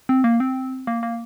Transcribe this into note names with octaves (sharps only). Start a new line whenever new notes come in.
C4
A#3
C4
A#3
A#3